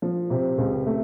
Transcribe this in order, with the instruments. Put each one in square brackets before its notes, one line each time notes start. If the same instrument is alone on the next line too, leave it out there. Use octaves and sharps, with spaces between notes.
[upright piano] F3
C3
C#2
A3